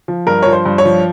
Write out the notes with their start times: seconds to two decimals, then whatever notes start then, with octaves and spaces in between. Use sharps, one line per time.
0.08 F3
0.27 G2 A#4
0.42 F3 C#5
0.53 C5
0.66 G2
0.78 C#5
0.85 F3